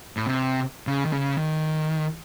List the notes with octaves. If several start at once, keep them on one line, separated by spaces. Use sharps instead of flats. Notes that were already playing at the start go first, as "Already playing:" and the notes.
A2
C3
C#3
D#3
C#3
D#3